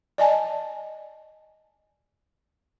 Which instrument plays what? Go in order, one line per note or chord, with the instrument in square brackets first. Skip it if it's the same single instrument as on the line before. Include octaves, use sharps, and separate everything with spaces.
[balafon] D5 D#5 G#5 A5